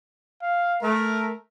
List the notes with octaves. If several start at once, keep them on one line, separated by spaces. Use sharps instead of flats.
F5
A3 A#4